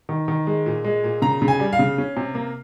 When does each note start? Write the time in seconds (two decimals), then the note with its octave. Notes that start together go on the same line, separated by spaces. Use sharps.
0.09 D#3
0.28 D#3
0.47 G#3
0.66 A#2
0.84 G#3
1.04 A#2
1.22 C#3 A#5
1.42 C#3
1.48 G#5
1.60 G3
1.73 F5
1.79 C#3
1.98 C#4
2.17 C3
2.35 A#3